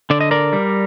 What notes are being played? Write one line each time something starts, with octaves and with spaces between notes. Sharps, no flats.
D3 D5
D#5
A#4 D5
G3